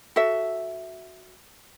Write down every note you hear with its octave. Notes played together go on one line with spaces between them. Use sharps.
F#4 A4 E5